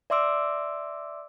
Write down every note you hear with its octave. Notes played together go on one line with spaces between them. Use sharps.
D5 E5 C6 D6 E6 D7